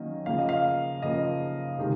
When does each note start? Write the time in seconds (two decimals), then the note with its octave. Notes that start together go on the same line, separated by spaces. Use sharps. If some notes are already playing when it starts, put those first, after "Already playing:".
Already playing: D#3 F#3 A#3 C#4 D#5
0.26 C#3 F3 A#3 F5
0.38 D#5
0.49 F5
1.02 C#3 F3 A#3 D#5
1.78 C3 D#3 G#3